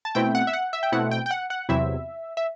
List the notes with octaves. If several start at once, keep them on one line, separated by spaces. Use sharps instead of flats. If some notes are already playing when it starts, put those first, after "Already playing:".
A5
B2 A3 C4 E4 G5
F#5
E5
F#5
E5
G5
B2 A3 C4 E4 F#5
G5
G5
F#5
F#5
E2 C3 F#3 C4 E4 E5
E5